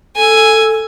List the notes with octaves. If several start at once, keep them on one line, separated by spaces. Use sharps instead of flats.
A4 G#5